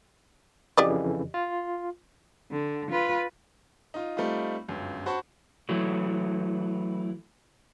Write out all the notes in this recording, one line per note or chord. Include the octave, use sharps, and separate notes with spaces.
F2 C#3 E3 G4 D5 D#5
F4
D3
F4 B4
D#4 F4
G3 A3 C4 D#4 F4
G1 C#2 F#2
F#4 C5 A5 B5 C#6
E3 F#3 A3